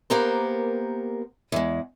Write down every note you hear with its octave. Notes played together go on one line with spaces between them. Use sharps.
A#3 B3 G4 A#4 C5
E2 G#3